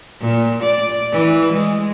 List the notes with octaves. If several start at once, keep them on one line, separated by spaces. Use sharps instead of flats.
A#2
D5
E3
G#3